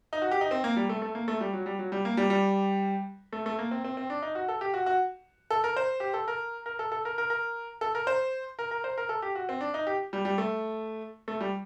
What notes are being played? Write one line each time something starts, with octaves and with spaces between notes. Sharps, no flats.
D#4
F#4
G4
D#4
C4
A#3
G3
A3
A3
A#3
A3
G3
F#3
G3
F#3
G3
A#3
G3
G3
A3
A3
A#3
C4
C4
C4
D4
D#4
F#4
A4
G4
F#4
F#4
A4
A#4
C5
G4
A4
A#4
A#4
A4
A4
A#4
A#4
A#4
A4
A#4
C5
A#4
A#4
C5
A#4
A4
G4
F#4
C4
D4
D#4
G4
G3
G3
A3
A3
G3